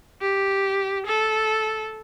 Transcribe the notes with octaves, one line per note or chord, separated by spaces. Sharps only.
G4
A4